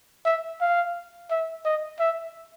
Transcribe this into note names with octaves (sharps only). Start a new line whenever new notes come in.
E5
F5
E5
D#5
E5